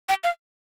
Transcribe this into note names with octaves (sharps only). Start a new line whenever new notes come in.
G5
F5